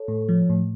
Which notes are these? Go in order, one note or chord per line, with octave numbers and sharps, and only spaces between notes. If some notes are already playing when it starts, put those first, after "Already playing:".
Already playing: A4 C#5
A2
F3
A2